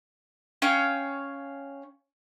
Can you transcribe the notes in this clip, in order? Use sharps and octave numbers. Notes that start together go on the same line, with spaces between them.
C#4 C#5 F5 G5